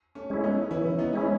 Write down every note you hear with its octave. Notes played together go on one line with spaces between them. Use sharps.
A3 C#4
G#3 C#4 E4
B3 D#4
E3 C#4 E4
B3 D#4
G#3 C#4 E4